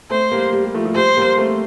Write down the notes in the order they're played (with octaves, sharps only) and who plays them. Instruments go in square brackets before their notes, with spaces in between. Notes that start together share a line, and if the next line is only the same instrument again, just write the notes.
[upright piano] A3 C4 [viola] C5
[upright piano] G3 A#3
G3
G3
F3 A3
F3
[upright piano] G3 [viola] C5
[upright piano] G3 A#3
A3 C4